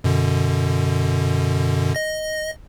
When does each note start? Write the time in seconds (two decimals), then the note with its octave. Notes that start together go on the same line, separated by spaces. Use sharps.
0.04 F#2 B2 D3
1.95 D#5 A#6